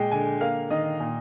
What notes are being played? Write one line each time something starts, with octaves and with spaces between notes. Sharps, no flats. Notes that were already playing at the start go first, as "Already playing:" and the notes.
Already playing: A#2 G#3 G5
D3 G#5
A#3 F5
D#3 D#5
A#2